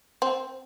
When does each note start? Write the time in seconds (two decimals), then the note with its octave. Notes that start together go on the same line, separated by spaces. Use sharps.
0.22 C4